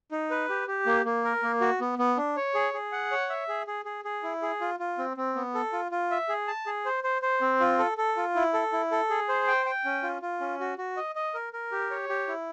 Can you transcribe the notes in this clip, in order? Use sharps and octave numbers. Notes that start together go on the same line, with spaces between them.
D#4
B4
G4
G4
A#3
A#3
A#4
A#3
F#4
B3
B3
D4
C#5
G#4
G#4
F#5
C#5
E5
G#4
G#4
G#4
G#4
E4
G#4
F4
F4
C4
C4
B3
A4
F4
F4
E5
G#4
A5
G#4
C5
C5
C5
C4
F4
A4
A4
F4
E4
A4
E4
A4
G#4
C5
G5
G5
C#4
F4
F4
C#4
F#4
F#4
D#5
D#5
A#4
A#4
G4
C#5
G4
E4